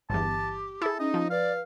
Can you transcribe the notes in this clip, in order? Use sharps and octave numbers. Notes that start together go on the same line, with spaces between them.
G1 E2 G4 A5
E4 G#4 A4
C#4 D#4 D#5
F3
B4 D5 F5